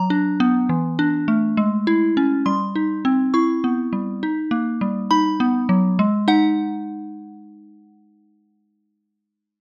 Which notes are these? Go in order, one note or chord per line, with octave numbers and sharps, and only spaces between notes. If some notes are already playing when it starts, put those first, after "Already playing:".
Already playing: F#3 A#5
D4
B3
E3
D4
A3
G#3
E4
C#4
G3 C6
D#4
C4
E4 C#6
B3
G3
D#4
A#3
G3
D#4 B5
B3
F#3
G#3
D#4 F#5